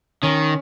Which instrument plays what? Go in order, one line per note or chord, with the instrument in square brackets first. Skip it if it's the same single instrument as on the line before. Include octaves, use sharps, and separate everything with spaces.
[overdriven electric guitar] D#3 [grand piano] C#4